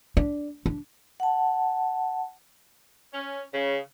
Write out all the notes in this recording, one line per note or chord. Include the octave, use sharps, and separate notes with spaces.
D4
D4
F#5 A5
C#4
C#3